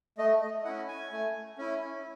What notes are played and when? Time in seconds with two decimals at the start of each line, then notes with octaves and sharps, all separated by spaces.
0.18 A3 D#5
0.42 D#5
0.65 C#4 E4 F#5
0.88 G#5
1.12 A3
1.58 C#4 E4